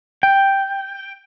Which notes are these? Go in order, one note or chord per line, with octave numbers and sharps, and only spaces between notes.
G5